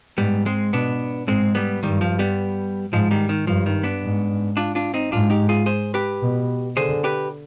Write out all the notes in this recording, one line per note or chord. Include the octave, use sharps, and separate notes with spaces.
G#2 G3 B3
G#3 C4
B2 B3 D4
G#2 G#3 C4
G3 B3
G2 D#3 G3
F3
G3 B3
G#2 F3 G#3
D#3 G3
D#3
G2 F3
D#3
B3 D4
G#2
D4 F4
D4 F4
C4 D#4
G#2 D4 F4
D#4 G4
F4 G#4
G#4 C5
G4 B4
B2
D3 G#4 C5
G4 B4